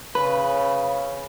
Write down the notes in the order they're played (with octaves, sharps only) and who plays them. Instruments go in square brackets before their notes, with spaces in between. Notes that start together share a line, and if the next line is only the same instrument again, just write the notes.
[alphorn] C#3 [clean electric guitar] B4